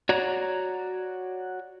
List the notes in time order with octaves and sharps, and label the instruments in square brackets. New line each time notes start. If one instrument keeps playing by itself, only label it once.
[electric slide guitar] F#4 C#5 D5 A#5